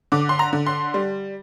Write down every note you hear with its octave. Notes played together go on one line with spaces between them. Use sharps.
D3 D6
C6
A#5
D3
C6
G3